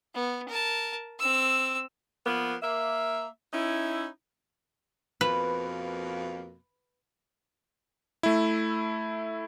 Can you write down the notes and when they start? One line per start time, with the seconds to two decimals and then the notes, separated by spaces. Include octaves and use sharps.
0.14 B3
0.49 A#4 A5
1.19 C4 E6
2.26 F3 A#3 B3
2.63 A#3 E5
3.53 C#4 D#4 E4
5.21 F2 B2 A#3 B4
8.23 A3 E4